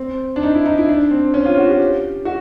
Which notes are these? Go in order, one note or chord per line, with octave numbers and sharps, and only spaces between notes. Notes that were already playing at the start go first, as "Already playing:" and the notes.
Already playing: C4
D4
D#4
E4
D#4
E4
D4
C4
C#4
F4
F#4
G4
F#4